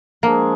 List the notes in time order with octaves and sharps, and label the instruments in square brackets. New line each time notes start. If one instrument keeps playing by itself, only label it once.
[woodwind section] F3 G#3 D4 G#4 [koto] A#3